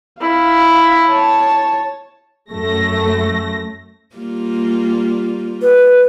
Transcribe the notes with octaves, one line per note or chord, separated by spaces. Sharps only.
E4 F5
C#5 A5
F#2 F#3 A3 A#6
G3 A#3 F4
B4